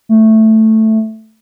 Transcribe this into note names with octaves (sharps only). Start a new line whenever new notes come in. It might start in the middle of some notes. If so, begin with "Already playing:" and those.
A3